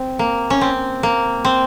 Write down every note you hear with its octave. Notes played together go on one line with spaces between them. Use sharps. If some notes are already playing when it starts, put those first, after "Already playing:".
Already playing: C4
A#3
C#4
C4
A#3
C4